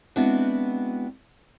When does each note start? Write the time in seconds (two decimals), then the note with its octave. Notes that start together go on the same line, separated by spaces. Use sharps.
0.16 G#3 B3 C4 D4 E4 F#4